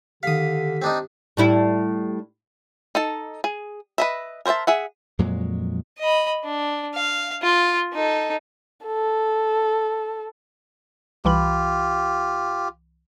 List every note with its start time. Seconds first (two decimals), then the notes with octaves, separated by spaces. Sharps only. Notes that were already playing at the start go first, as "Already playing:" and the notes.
0.23 D3 D#3 G4 F5 D#6 B6
0.82 C4 D4 D#4
1.37 A2 G3 E4
2.95 D#4 A4 A5
3.44 G#4
3.98 B4 D#5 E5
4.46 A#4 C5 C#5 E5 A5
4.67 G#4 E5 F#5
5.19 F2 A#2 F#3 G#3
5.99 D#5 B5
6.44 D4
6.94 F5
7.42 F4
7.93 D#4 A4
8.86 A4
11.25 C2 E3 F4 G4 B5